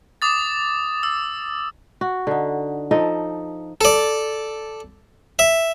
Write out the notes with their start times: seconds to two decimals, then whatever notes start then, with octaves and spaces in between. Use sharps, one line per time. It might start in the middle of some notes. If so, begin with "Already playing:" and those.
0.22 D6 D#6 A6
1.03 E6
2.01 F#4
2.27 D3 D#4
2.91 F3 D#4 A4 D#5
3.81 A4 D5
5.39 E5